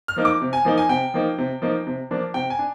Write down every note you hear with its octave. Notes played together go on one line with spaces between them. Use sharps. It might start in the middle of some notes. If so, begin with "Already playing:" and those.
F6
F3 A#3 D#4
D6
C3
G#5
F3 A#3 D#4
G#5
C3 G5
F3 A#3 D#4
C3
F3 A#3 D#4
C3
F3 A#3 D4
C3 G5
G#5
D4